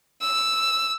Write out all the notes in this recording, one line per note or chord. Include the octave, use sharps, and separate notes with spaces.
E6